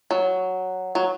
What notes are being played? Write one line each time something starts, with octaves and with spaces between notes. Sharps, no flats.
F#3
F#3